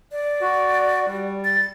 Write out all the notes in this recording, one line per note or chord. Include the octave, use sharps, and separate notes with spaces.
D5
F#4
G3
A6